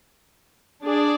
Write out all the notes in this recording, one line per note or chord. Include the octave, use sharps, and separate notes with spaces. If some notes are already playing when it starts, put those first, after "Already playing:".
D4 G#4 D5